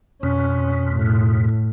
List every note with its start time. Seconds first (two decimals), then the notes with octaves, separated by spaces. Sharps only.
0.23 F2 B2 C#4
0.91 A2